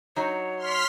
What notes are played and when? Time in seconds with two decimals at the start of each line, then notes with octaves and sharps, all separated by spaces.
0.16 F#3 D#4 F#4 C#5
0.57 C6 F6 B6